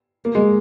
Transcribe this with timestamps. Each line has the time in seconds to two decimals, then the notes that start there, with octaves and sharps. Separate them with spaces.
0.25 A#3
0.35 G#3